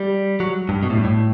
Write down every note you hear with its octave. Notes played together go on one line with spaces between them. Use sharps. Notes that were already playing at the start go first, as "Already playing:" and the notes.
Already playing: G3
F#3
G2
B2
A2
G2
A2